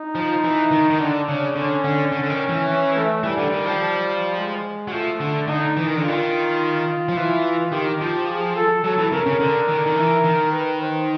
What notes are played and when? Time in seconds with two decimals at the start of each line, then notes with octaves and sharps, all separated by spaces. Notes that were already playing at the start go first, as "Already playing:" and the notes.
Already playing: D#4
0.15 F3
0.44 E3
0.71 D#3
0.90 D#3
1.00 D3 D4
1.28 C#3
1.55 D3 C#4
1.84 D3
2.12 D3
2.23 D3
2.30 D#3
2.49 E3
2.68 C#4
2.96 A3
3.23 E3 G3
3.37 D3
3.53 D#3
3.65 F3
4.36 G#3
4.88 F#3
4.92 F3 A3
5.21 D3
5.48 D3 D#4
5.77 E3
5.86 D#3
5.96 D3
6.05 D#3 F4
7.09 F3
7.17 E3
7.72 D#3 G4
8.01 F3
8.29 G#4
8.56 A4
8.84 F#3 A4
8.98 E3
9.12 C#3 A#4
9.26 C#3
9.40 D3
9.68 D#3
9.78 D3
9.86 D#3
9.97 E3
10.25 D#3
10.52 B4
10.81 C5